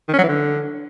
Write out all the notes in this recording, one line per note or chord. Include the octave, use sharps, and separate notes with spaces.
D#3
C#4
F#3
E3
D3